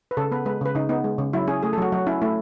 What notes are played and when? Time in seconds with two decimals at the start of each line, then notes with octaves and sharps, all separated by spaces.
0.11 B4
0.17 C#3 A4
0.32 B3 B4
0.45 G#3 B4
0.61 C#3 B4
0.75 C#3 D#4
0.89 B3 D#4
1.04 G#3
1.18 C#3
1.33 F#3 E4
1.48 C#4 G#4
1.63 A3 G#4
1.73 A4
1.78 F#3 F#4
1.92 F#3 F#4
2.07 C#4 E4
2.22 A3 E4